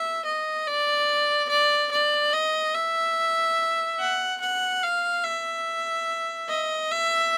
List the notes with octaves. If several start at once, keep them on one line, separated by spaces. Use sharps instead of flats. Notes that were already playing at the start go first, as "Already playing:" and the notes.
Already playing: E5
D#5
D5
D5
D5
D#5
E5
F#5
F#5
F5
E5
D#5
E5